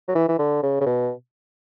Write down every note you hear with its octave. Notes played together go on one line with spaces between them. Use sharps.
F#3
E3
E3
D3
C#3
C#3
B2